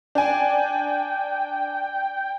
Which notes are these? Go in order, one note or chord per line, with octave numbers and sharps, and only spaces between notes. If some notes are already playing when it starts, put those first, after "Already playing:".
D4 G5 G#5